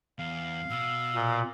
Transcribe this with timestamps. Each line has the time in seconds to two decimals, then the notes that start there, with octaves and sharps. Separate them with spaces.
0.19 E2 F5
0.70 B2 E6
1.15 A#2